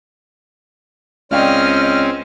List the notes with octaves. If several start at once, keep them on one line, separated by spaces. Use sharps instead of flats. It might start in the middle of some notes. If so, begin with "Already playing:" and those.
C#2 C4 C#4 D5 D#5 F5 G5 F6